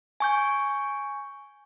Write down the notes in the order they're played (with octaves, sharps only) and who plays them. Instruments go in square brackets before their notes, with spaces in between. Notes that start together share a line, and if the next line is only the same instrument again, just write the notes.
[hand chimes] G#5 C#6 G6